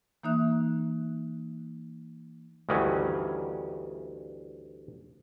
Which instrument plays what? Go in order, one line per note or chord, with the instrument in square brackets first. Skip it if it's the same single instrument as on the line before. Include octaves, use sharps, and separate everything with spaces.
[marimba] E3 A#3 D#4 E5 F#6
[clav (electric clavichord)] D2 G2 D#3 E3 C#4